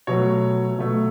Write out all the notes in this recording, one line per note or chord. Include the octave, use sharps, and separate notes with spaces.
B2 F#3 A3 C#5
B2 F#3 A3